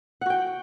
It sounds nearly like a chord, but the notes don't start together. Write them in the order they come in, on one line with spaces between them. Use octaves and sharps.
F#5 F#4 G5